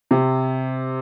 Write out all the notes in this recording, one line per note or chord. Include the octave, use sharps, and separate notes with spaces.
C3